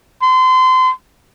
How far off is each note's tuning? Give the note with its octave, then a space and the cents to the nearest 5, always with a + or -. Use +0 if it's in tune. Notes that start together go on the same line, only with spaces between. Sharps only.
C6 -30